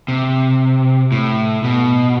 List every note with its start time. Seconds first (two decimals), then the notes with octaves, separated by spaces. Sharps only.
0.08 C3
1.12 A2
1.64 B2